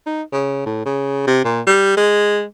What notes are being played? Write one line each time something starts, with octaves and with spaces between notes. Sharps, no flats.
D#4
C#3
A2
C#3
C3
A#2
G3
G#3